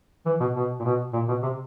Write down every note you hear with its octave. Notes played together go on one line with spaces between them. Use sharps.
E3
B2
B2
A#2
B2
A#2
B2
C3